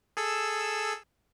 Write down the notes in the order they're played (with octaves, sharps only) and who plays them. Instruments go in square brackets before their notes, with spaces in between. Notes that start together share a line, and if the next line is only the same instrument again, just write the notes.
[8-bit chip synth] G#4 A4 E6